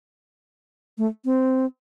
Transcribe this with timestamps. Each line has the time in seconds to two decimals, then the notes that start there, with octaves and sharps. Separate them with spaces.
0.98 A3
1.25 C4